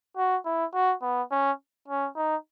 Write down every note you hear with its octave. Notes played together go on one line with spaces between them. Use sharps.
F#4
E4
F#4
B3
C#4
C#4
D#4